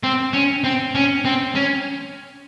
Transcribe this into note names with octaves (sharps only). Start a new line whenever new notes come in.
C4
C#4
C4
C#4
C4
C#4